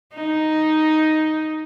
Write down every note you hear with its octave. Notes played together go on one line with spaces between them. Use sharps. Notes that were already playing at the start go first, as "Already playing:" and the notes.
D#4